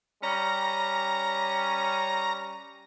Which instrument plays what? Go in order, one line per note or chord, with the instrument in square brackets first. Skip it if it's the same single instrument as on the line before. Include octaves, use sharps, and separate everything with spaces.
[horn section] G3 C#4 [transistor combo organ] A#5